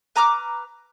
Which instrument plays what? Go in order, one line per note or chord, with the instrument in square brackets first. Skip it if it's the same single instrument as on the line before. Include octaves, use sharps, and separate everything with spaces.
[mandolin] B4 A#5 D6 F6